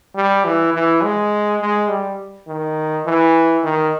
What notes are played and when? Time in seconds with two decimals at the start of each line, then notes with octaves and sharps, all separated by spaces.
0.16 G3
0.45 E3
0.74 E3
1.03 G#3
1.61 G#3
1.89 G3
2.48 D#3
3.06 E3
3.64 D#3